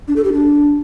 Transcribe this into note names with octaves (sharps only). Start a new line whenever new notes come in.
D4
A4
G4
D4